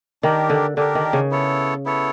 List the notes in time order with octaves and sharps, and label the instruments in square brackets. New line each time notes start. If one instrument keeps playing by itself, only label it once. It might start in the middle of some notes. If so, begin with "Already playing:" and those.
[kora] D#3 [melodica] D4 G4 A#4
[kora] D3
[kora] D3 [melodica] D4 G4 A#4
[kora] D#3
C#3
[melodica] B3 E4 A4 C#5
B3 E4 A4 C#5